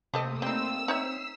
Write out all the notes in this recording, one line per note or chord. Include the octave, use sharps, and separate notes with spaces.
C3 A3 A#3 G4 A4 D#5 D#6
G3 C4 D#4 E6
D#4 C#5 E5 B6 C7